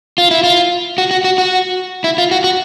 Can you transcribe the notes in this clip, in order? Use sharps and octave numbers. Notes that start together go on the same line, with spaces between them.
F4
E4
F4
F#4
F#4
F#4
F#4
E4
F4
F#4
F#4